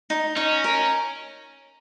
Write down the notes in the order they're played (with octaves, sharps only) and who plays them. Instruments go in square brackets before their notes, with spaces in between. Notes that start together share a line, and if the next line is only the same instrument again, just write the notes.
[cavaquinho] D#4
[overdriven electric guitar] C#4 [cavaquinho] D#4
[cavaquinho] A#4